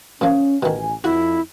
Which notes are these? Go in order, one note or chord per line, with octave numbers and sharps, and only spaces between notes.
A#2 F3 C#4
A1 B2 D#3 G#5
F2 E4 F#4